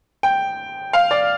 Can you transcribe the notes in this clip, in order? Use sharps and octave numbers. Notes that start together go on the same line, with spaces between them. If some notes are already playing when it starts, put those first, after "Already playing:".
G5
F5
D5